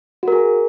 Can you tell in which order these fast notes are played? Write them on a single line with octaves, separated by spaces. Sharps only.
F#4 A#4 G#4